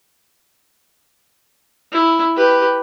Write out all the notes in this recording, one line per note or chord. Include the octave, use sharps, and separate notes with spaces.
E4
G4 B4